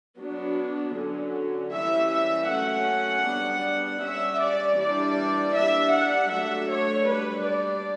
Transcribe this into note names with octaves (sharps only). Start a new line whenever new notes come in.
F#3 B3 D4
D3 F#3 C#4
E3 G3 C#4 E5
E5
F#3 A3 C#4 F#5
G3 B3 D4
G3 C#4 E5
D5
E3 G3 D4 D5
G3 D4 E5
F#5
F#3 A3 D4 E5
C#5
G3 D4 B4
D5